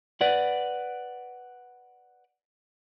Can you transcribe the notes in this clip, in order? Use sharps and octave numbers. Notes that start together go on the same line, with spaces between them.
B4 D5 F#5